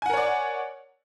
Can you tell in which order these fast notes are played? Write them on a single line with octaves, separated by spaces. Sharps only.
G#5 F#5 A#4 C#5 D5